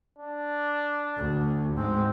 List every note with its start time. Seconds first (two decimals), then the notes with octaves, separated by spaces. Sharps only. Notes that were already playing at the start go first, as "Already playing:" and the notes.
0.19 D4
1.17 D2
1.77 G#2 G#3 C4